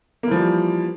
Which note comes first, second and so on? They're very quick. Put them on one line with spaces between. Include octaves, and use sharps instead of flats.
A#3 E3 F3 G3